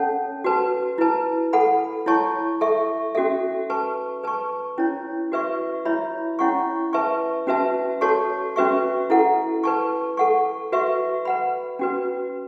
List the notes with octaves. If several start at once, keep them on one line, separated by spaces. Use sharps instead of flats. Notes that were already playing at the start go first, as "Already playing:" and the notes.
Already playing: C#4 A4 C#5 F#5 A5
F#4 B4 A5
E4 B4 A5
A4 F#5 B5
E4 C#5 A5 C#6
A4 E5 C#6
C#4 F#4 A4 E5
B4 A5 C#6
B4 A5 C#6
C#4 E4 C#5
F#4 B4 E5 C#6
E4 C#5 E5 B5
C#4 E4 C#5 F#5 C#6
B4 E5 A5 C#6
C#4 F#4 B4 E5 A5
F#4 A4 C#5 A5 C#6
C#4 F#4 B4 E5 C#6
E4 A4 F#5
B4 A5 C#6
A4 F#5 C#6
F#4 B4 E5 C#6
B4 F#5 B5
C#4 F#4 B4